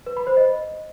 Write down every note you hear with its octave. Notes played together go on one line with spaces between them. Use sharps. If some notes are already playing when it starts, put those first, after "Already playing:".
B4
B5
C5
D#5